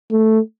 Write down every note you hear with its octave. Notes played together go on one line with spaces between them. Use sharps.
A3